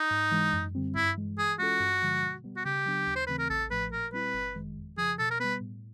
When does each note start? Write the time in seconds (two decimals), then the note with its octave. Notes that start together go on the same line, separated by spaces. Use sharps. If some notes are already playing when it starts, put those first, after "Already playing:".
Already playing: D#4
0.11 G#2
0.31 E3 G#3
0.53 F#2
0.75 D3 G3 C4
0.95 G2 E4
1.17 E3 G#3
1.37 E3 G#4
1.59 G#3 C#4 F4 F#4 A4
1.80 G2
2.02 D3 F3 G#3
2.23 B2
2.44 G3 B3
2.56 F#4
2.65 C#3 G4
2.86 F#3 B3 D4
3.07 D#2
3.15 C5
3.27 C#3 E3 A3 C4 B4
3.39 A#4
3.49 A1 A4
3.71 A2 F3 A3 B4
3.91 A#2 A#4
4.13 G3 C4 E4 B4
4.34 G1
4.55 F#2 D#3 G#3
4.77 F2
4.98 C#3 F3 G#4
5.19 B2 A4
5.31 A#4
5.40 G3 B3 B4
5.60 A2